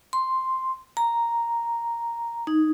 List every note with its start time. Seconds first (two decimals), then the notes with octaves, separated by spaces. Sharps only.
0.13 C6
0.97 A#5
2.47 D#4